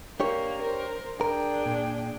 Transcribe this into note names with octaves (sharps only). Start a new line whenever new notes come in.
A#3 D4 G4 C#5
A#4 C5
D4 G#4 A#4 G5
A#2